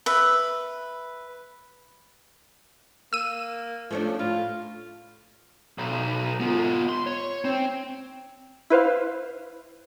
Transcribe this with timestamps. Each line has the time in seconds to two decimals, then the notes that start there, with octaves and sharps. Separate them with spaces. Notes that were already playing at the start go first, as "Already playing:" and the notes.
0.06 B4 E5
3.13 A#3 E6 D#7
3.91 F3 A3 C#4 D4
4.19 A2 F4
5.78 B1
6.40 B3 F4
6.89 C6
7.07 C#5
7.45 C4
8.70 E4 B4 C5 F5